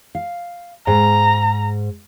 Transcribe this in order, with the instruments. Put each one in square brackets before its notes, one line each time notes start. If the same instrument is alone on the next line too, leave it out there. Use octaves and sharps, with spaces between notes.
[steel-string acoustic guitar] F5
[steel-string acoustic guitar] G#2 [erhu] A#5